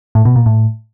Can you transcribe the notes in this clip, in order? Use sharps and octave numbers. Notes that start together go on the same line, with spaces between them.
A2
B2
A#2
A2